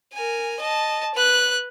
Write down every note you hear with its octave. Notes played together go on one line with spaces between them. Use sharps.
A#4 G#5
D#5 A5
B4 F#6